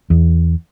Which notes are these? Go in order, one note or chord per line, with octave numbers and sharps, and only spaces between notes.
E2